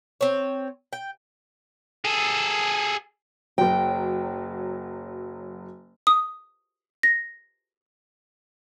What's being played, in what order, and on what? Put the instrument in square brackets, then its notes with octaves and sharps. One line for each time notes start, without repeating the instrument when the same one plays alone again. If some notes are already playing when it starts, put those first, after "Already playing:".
[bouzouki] C4 C#5
G5
[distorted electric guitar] G#4 A4
[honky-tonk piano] F#1 F#3 [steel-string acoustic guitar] G5
[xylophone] D#6
A#6